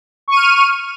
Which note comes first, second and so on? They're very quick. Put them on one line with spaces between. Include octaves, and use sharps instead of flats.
C#6 D#7 F6